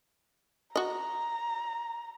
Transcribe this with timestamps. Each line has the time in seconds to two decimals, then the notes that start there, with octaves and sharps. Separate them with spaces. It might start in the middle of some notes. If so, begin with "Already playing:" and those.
0.76 F#4 D#5 A#5